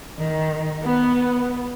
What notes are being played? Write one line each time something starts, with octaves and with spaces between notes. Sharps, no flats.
D#3
B3